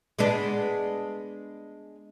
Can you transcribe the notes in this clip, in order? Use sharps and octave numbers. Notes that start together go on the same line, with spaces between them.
G#3 B3 D4